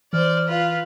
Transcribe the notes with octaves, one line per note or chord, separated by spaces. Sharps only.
E3 C5 D5 F6
F4 B4